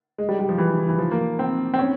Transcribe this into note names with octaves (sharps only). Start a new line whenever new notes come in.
G#3
G3
G3
F3
E3
E3
F3
A#3
C4
C4
C#4